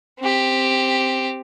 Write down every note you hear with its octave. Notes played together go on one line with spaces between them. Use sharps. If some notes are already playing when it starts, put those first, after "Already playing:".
C4 G4